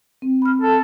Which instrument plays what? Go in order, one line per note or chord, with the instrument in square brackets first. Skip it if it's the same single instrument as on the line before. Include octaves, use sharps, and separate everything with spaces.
[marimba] C4
B5 F6
[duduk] A4